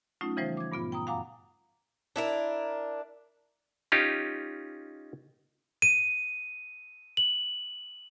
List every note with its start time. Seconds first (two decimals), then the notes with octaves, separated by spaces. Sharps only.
0.21 F#3 A3 C#4 D#4 F4
0.37 C#3 E3 F3 G3 C5
0.57 D6 G#6
0.71 G2 A#2 B3 F4
0.92 G5 A#5 D#6
1.07 F#2 F5 F#5 G#5 A#5 D6
2.16 D4 E4 A#4
3.92 C#4 D#4 F4 G4
5.82 D#7
7.17 F#7